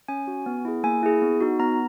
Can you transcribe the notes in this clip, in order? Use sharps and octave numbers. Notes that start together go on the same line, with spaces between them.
C#4 G#5
F#4
B3
E4 G#4
A#3 G#5
E4 G#4
B3
D#4 F#4
B3 A#5